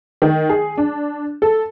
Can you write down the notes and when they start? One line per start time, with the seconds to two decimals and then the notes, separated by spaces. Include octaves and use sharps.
0.22 D#3
0.50 G#4
0.77 D4
1.42 A4